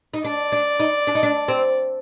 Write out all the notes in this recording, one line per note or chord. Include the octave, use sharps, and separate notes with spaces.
D#4
D4 D5
D4
D#4
D4
D#4
D4
C4